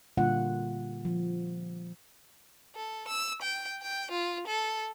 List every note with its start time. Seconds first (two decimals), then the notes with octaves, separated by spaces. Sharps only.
0.17 A#2 D3 G3 A#3 F4 F#5
1.05 F3
2.75 A4
3.08 E6
3.42 G5
3.82 G5
4.11 F4
4.47 A4